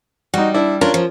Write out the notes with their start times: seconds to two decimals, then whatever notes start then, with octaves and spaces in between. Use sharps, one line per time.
0.34 G3 D#4 F#4
0.54 D4 E4
0.81 C#4 D4 F4 A#4
0.94 F3